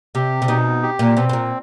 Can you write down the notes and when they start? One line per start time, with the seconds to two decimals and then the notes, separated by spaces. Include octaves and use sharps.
0.15 C3 G4
0.42 C3
0.48 B2 D#4
0.83 G4
0.99 A#2
1.16 B2 C4
1.29 B2
1.33 A#2